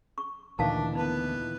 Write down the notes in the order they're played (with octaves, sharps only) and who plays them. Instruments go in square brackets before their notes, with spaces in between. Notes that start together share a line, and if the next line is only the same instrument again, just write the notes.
[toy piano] C#6
[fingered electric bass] D2 [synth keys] A#2 D#3 E3 [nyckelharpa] D4 [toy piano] F5 A5
[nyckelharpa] B3 B4 [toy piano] D#4